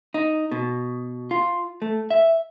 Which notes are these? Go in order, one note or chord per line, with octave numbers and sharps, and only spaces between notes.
D#4
B2
F4
A3
E5